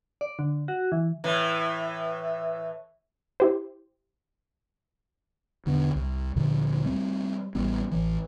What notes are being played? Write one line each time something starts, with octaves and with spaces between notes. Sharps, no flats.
D5
D3
F#4
E3
A2 E3
E4 G4 C5
E1 D3 B3 D4
C2
D2 A#2 D3 F3
G3 A3 C4
A1 G3 B3
A1 E3